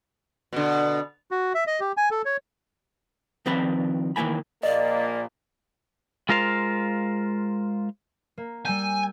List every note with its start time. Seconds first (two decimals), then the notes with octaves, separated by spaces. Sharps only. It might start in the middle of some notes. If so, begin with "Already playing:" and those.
0.53 B2 D3
1.31 F#4
1.54 E5
1.67 D#5
1.80 G4
1.97 G#5
2.11 A4
2.25 C#5
3.46 D#3 F3 C4 B4 D5 B5
4.16 D#3 E3 A#3 G#5 B5
4.63 A#1 A#2 A#3 D5 D#5
6.29 G#3 F4 A#4 C5 F5
8.38 A#3
8.65 G3 G#5 E6 G6